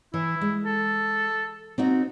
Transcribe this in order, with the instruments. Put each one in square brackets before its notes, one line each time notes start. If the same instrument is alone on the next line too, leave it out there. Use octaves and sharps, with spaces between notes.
[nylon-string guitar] E3 [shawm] E4
[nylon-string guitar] G#3
[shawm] A4
[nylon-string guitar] C4 D#4 F#4